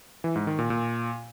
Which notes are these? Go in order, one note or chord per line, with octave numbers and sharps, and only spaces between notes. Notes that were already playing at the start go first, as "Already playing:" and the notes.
E3
G#2
D#3
A#2
A#2